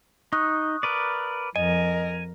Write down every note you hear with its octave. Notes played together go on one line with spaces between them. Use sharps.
D#4 C#6 D#6 F#6
A#4 B4 D5
F2 A#4 D#5 G#5